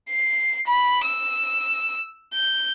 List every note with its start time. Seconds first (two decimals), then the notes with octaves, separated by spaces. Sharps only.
0.10 C7
0.67 B5
1.04 E6
2.34 G6